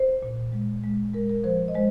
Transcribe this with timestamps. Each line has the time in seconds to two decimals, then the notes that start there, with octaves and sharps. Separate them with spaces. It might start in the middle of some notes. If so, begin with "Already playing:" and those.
Already playing: C5
0.23 A#2
0.52 G#3
0.84 G#3
1.14 G#3 A#4
1.30 A#4
1.44 F3 C5
1.68 D#5
1.74 G#3 C5